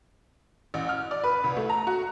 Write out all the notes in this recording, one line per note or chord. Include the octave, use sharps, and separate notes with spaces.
A1
F6
D5
B4
C2
A3
A#5
F#4